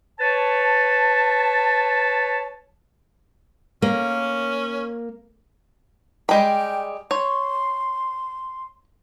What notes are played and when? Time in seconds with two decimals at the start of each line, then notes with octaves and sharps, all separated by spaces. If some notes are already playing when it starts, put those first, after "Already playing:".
0.20 B4 C#5 A5
3.82 A#3 C#4
6.29 G3 G#3 G5 B5
7.11 C#5 C6